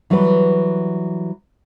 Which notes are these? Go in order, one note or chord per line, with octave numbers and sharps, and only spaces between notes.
E3 F#3 G3 B4